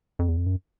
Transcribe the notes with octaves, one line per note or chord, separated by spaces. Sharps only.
F2
E2
F2
F#2